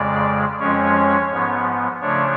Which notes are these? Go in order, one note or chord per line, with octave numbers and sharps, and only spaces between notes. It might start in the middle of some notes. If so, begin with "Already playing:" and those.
Already playing: F2 C#3 G#3 D5
F2 F3 G#3 C#4 C#5
G#2 F3 B3
C#3 F3 A3 D4 C#5